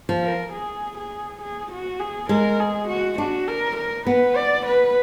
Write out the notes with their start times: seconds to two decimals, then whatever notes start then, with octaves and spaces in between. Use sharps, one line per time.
0.09 F3
0.23 A#4
0.53 G#4
0.98 G#4
1.42 G#4
1.71 F#4
2.00 G#4
2.29 G#3 A#4
2.60 G#4
2.88 F#4
3.18 D4 F#4
3.48 A#4
3.77 A#4
4.07 B3 B4
4.36 D5
4.66 B4